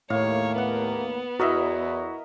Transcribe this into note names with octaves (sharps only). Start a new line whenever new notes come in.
D#2 A2 A3 A#3 C#5 F5
B3 F#5
E2 E4 F#4 A#4 D#5 E5